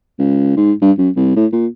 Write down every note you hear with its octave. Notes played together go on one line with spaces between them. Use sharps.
C#2
G#2
G2
F#2
C2
A2
A#2